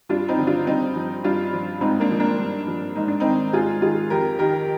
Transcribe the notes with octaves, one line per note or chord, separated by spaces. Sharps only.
G2 D4 F4
C4 D#4
D3 F3
D4 F4
G2 C4 D#4
F3
G2 D4 F4
F3
G#2 C4 D#4
A#3 D4
F3
A#3 D4
G2
F3
G#2 D#4
D4
D#3 C4 D#4
G#2 F4 G#4
D#3 F4 G#4
F2 G4 A#4
D#3 G4 A#4